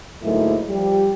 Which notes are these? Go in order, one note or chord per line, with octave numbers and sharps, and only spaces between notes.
D2 G#2 F#3 A3 A#3 E4
F3 G3